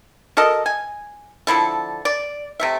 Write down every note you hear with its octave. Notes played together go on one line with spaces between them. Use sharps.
F#4 A4 A#4 D#5
G#5
D3 F3 E4 A4
D5
C3 A3 E5